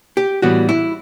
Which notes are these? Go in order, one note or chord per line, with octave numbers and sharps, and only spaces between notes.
G4
A2 E3 G3 B3 F#4
E4